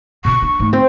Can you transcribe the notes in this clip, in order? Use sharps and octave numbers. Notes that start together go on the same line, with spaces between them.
B2 C#4 C#6
D4
G#2 A3
C4